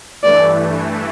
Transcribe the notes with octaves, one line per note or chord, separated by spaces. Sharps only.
G2 E3 A3 D5